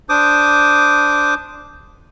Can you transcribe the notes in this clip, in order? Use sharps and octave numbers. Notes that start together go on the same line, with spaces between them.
D4 C5 D6 D#6